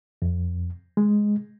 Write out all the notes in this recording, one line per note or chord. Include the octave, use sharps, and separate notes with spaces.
F2
G#3